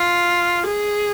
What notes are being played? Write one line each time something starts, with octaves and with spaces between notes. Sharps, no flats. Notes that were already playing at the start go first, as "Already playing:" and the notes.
Already playing: F4
G#4